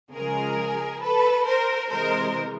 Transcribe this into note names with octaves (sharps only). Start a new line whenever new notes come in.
C#3 F3 G#3 G#4 A#4
A4 B4
A#4 C5
C3 E3 G#3 A#4 C5